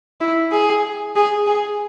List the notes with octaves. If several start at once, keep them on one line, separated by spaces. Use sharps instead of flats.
E4
G#4
G#4
G#4